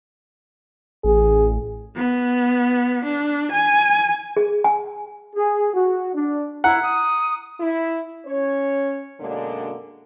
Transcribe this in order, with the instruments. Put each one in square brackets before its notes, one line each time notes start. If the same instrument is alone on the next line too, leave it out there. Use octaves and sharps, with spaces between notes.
[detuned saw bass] A1 [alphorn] G#4
[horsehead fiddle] B3
D4
G#5
[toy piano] G#4
G#5
[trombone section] G#4
F#4
D4
[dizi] E4 [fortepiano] F#5 [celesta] A#5
[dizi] D#6
[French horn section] E4
C#4 C#5
F#2 B2 D3 G#3 A#3 D4